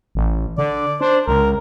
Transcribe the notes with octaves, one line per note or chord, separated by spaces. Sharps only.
A1
D3 D5
D4 C5
C#2 A#4